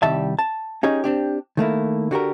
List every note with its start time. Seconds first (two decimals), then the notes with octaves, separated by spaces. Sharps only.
0.03 C2 D#3 G3 E5 A5
0.39 A5
0.83 C#4 D#4 G4 G#4 C#5
1.04 C4 D4 G4
1.57 D#3 A3 A#3 E4
2.11 D3 F#4 G4 A#4